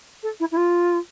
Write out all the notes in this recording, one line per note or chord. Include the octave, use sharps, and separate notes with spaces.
A4
E4
E4
F4